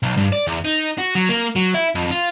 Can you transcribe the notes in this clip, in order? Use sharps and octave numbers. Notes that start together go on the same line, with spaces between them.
B1
G2
D5
E2
D#4
F#4
F#3
A#3
F#3
E4
F2
F4